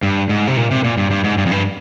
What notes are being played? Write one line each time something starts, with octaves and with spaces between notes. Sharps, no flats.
G2
G#2
C3
A#2
C3
A#2
G2
G2
G#2
G2
F2
G2